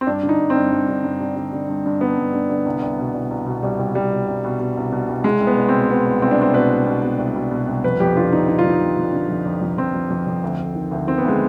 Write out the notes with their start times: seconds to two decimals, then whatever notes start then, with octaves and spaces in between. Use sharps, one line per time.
0.01 C4
0.07 G2 D4
0.23 D3
0.29 D#4
0.40 G2
0.50 C4
0.56 G2
0.71 G2
0.88 D3
1.04 G2
1.21 D3
1.36 D3
1.53 D3
1.69 G2
1.86 G2
2.01 D3 B3
2.18 G2
2.33 D3
2.50 D3
2.66 C2
2.82 C2
2.99 B2
3.14 C2
3.31 C2
3.46 B2
3.63 C2 G3
3.79 C2
3.95 C2 G3
4.11 B2
4.28 C2
4.44 B2
4.60 B2
4.77 C2
4.92 B2
5.09 C2
5.24 C2 G#3
5.41 C2
5.47 B3
5.58 C2
5.69 C4
5.74 B2
5.90 C2 B3
6.05 C2
6.22 C2 C4
6.31 D4
6.38 C2 C4
6.54 B2 B4
6.71 C2
6.86 B2
7.02 B2
7.18 C2
7.35 B2
7.51 B2
7.67 C2
7.84 F2 B4
8.00 F2 G4
8.16 D3 F4
8.32 D3 D#4
8.48 D3 D#4
8.59 F4
8.64 F2
8.70 D#4
8.81 F2
8.97 F2
9.13 D3
9.29 F2
9.45 F2
9.61 F2
9.78 F2 C4
9.94 F2
10.10 F2
10.27 F2
10.43 D2
10.58 D2
10.75 D#3
10.91 D2
11.07 D#3 C4
11.18 B3
11.23 D2
11.28 G#3